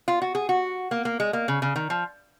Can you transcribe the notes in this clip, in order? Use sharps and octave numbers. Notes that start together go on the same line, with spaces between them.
F4
F#4
G#4
F#4
A#3
A#3
G#3
A#3
C#3
C#3
D#3
F3